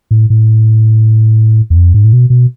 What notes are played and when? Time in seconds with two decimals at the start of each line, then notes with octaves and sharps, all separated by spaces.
0.11 A2
0.30 A2
1.70 E2
1.76 F2
1.94 G#2
2.04 A2
2.13 B2
2.30 B2